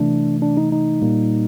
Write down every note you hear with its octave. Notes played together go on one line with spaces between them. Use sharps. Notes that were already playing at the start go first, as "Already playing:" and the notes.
Already playing: C3 E3 A3 D4
D4
D#4
D#4
A#2 G3 A#3